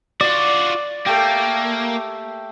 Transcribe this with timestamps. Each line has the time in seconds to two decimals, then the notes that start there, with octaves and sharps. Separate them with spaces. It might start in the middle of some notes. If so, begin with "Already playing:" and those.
0.21 F4 F#4 D5
1.06 A3 A#3 G4